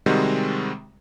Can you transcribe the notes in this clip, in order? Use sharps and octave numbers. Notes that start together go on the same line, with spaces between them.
C3 D#3 G3 G#3 C4 F#4